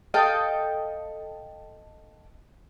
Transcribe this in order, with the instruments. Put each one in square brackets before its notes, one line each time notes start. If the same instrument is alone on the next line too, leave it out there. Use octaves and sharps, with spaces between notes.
[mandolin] A4 D#5 F5 G5